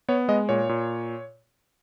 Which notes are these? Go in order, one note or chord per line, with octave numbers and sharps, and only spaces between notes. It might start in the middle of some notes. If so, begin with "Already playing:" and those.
B3 C#5
G#3 D#5
A#2 C#5
A#2